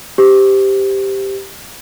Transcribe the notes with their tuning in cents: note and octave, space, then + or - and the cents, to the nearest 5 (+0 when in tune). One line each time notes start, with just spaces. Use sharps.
G4 +0 C5 -25